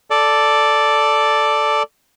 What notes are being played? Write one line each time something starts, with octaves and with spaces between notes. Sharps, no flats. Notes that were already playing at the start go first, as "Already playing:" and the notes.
A4 D5